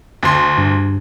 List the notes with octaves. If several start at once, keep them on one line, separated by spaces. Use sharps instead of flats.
D2 C6
G2